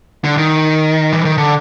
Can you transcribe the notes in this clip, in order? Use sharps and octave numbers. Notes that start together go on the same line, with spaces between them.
D3
D#3
E3
D#3
D3